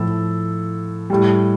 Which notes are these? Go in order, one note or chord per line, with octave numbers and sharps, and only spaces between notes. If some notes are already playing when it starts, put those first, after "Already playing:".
Already playing: A2 F3 A4
A2 G3